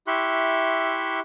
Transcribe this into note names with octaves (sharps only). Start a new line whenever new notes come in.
E4 G4 E5 C6 C#6 F#6